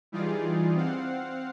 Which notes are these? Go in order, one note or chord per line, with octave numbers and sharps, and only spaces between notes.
E3 G3 D#4 F4 G#4 D5
C4 F5 F#5